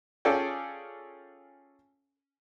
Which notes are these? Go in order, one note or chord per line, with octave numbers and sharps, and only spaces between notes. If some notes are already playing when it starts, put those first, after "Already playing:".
C#4 F4 G#4 A4 D5 G5